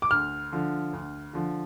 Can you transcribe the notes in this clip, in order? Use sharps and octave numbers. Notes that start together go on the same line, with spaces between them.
D6
D2 F6
D3 F3
D2
D3 F3